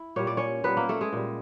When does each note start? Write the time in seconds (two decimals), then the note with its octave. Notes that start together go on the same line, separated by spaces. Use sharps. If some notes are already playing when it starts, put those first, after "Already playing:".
Already playing: E4
0.16 A#2 G3 C#5
0.27 D5
0.37 C#4 C#5
0.64 A#2 G3 B3 B4
0.77 A#3 A#4
0.89 A3 A4
1.01 G#3 G#4
1.13 A#2 G3